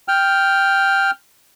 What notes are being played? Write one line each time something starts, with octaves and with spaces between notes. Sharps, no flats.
G5 F6